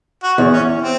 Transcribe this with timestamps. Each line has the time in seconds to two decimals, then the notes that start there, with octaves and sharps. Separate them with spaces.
0.23 F#4
0.38 E2
0.53 C#4
0.82 C4